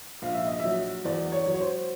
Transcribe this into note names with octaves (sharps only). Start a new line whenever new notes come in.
A#1 F5
E5
D#5
F#3 E5
E2 D5
C#5
F#3
C#5
C5